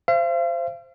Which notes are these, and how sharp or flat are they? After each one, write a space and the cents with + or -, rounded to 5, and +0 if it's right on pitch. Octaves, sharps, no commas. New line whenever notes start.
C5 +0 F5 -45